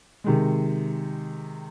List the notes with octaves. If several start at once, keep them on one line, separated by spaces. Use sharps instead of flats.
C3 D#3 G#3